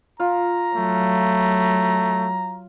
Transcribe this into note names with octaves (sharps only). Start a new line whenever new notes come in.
F4 A#5
F#3 A3